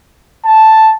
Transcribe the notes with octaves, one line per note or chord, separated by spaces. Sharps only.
A5